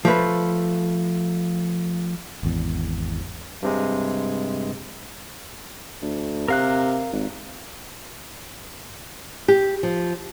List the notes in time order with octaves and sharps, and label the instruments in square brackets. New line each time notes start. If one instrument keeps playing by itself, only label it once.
[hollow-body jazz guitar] F3 A3 B4
[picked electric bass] G#1 E2
[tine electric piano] G2 C3 G#3
[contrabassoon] D2
[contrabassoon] C3 [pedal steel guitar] A#4 F5 F#6
[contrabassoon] G#1
[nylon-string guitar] G4
F3